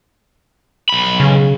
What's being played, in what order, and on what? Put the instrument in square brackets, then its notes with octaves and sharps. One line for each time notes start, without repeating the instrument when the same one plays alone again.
[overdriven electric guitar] B1 B5
[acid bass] C#3